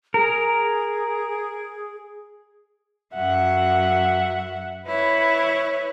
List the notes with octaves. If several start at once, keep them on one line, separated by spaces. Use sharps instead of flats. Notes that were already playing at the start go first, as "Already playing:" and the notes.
G#4 A#4
F#2 F#3 E5 F#5
E4 B4 C#5